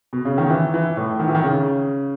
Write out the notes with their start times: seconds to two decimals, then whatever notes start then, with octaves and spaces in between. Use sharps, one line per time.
0.13 B2
0.25 C#3
0.38 D#3
0.50 E3
0.74 E3
0.97 A2
1.19 D#3
1.28 E3
1.35 D#3
1.43 C#3